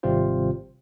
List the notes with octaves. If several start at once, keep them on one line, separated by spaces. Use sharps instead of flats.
G#1 C3 G3 C4 F4 C5